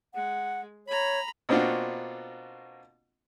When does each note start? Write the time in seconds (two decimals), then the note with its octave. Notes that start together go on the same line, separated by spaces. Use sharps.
0.14 G#3 F#5
0.87 C#5 A#5 B5
1.49 B2 A#3 C4 D4 F4 F#4